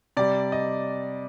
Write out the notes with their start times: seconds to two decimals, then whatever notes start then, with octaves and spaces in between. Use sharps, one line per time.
0.17 C3 G3 D5
0.52 D#5